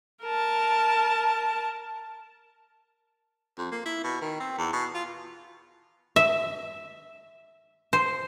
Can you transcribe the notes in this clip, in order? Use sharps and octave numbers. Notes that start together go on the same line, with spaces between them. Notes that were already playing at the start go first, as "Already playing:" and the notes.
A#4 A5
F2
A#3
E4
B2
D#3
C4
E2
B2
F4
E5
C5